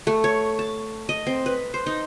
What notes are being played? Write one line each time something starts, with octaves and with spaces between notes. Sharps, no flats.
A3
C#5
A5
D#5
C4
B4
C5
D#4